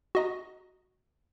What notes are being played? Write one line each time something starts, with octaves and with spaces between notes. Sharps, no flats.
F#4 D#5 A#5